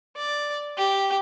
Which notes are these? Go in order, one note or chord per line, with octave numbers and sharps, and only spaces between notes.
D5
G4